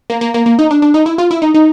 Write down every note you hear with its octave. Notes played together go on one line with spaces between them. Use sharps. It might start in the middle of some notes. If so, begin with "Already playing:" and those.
A#3
A#3
A#3
A#3
D#4
D4
D4
D#4
E4
F4
E4
D#4
D#4